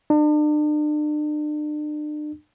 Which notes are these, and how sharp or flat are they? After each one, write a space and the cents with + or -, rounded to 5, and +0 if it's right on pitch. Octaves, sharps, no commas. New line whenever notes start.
D4 +40